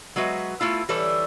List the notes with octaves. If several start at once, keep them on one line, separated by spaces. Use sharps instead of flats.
F#3 G#3 F#4 B4 E5
A3 E4 F4
E3 G3 A4 B4 C#5